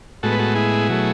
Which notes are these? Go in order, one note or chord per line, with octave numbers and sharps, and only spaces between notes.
A2 G#3 B3 F#4 A4
B4
F#4 A4
E4 G#4
B2 F#3 A3